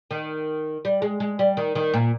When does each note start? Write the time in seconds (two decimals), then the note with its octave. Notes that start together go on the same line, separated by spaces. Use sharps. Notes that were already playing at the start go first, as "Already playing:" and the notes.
0.11 D#3
0.85 G3
1.02 G#3
1.20 G#3
1.39 G3
1.57 D#3
1.75 D#3
1.94 A#2